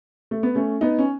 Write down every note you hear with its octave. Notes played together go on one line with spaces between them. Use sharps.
A3
B3
A3 C#4
B3 D#4
C#4